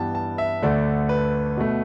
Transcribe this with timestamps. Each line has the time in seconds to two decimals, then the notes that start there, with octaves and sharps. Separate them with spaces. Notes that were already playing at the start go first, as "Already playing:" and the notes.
Already playing: G2 E3 G3 B3 G5 A5
0.15 A5
0.38 E5
0.62 D2 D3 A3 D5
1.09 B4
1.57 B2 A3